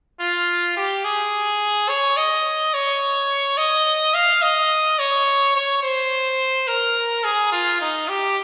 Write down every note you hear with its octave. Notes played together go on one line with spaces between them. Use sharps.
F4
G4
G#4
C#5
D#5
C#5
D#5
F5
D#5
C#5
C#5
C5
A#4
G#4
F4
D#4
G4